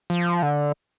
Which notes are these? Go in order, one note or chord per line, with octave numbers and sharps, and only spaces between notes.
F3
D3